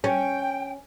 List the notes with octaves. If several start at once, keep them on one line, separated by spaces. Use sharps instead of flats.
C#4 G5